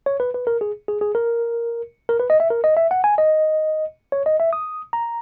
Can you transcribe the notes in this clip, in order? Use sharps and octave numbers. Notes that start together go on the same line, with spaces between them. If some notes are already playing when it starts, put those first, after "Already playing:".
C#5
B4
B4
A#4
G#4
G#4
G#4
A#4
A#4
B4
D#5
E5
A#4
D#5
E5
F#5
G#5
D#5
C#5
D#5
E5
D#6
A#5